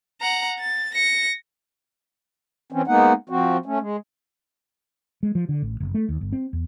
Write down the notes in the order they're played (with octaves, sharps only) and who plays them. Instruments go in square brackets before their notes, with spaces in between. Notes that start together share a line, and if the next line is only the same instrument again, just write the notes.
[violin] F#5 A#5
A6
A#6 C#7
[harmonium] E3 C4 C#4
G#3 A#3 B3 D#4 F#5
F3 C4 F#4
A3 C#4
G#3
[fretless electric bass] G#3
F3
D3
A1
F#1
A3
D#2
G1
C4
E2